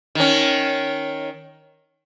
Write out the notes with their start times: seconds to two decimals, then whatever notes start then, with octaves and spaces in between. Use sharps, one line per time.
0.15 D#3 C#4